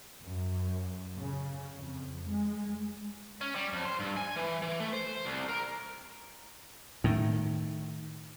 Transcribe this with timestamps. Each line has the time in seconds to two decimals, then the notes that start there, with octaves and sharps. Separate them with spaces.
0.20 F#2
1.18 C#3
1.77 F2
2.29 G#3
3.41 C#4
3.55 G3
3.73 F2
3.85 C5
4.00 G2
4.17 G#5
4.36 E3
4.62 E3
4.80 A3
4.93 C5
5.25 C2
5.49 A#4
7.04 A2 D#3